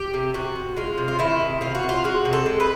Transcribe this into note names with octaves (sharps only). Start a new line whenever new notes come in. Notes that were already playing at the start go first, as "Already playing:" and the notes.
Already playing: G4
C3
C3 F#4
C3
G#3 F4
C3
F4
D#3 E4
C3
C3 F4
F#4
C3
F4
G#3 F#4
C3
A4
G#3
B4